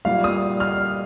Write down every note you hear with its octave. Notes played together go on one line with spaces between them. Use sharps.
A#2 G3 F5
D#6
F6